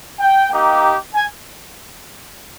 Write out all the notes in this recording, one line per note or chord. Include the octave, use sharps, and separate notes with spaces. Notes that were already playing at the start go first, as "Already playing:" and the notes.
G5
A#3 D#4 G4
G#5